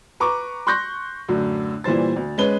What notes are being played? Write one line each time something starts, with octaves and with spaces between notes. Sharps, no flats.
B4 A#5 C#6 D6
C6 C#6 F#6 G6 A#6
F#2 A2 D3
A#2 E3 G3 C5 A6
D2
G#3 C#4 B4 G7